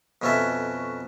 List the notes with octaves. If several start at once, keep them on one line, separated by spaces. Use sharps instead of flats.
F2 B2 C#4 F#4 A4 E5